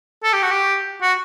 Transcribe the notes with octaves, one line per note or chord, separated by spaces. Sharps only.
A4
G4
F#4
G4
F#4